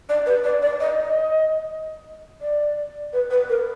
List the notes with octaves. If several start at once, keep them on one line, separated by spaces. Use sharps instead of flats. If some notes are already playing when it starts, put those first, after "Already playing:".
D5
B4
D5
D5
D#5
D#5
D5
B4
B4
A#4